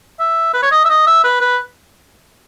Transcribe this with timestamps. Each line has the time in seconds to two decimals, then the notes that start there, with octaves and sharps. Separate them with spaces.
0.20 E5
0.54 B4
0.62 C#5
0.72 D#5
0.85 E5
0.89 D#5
1.07 E5
1.24 B4
1.41 B4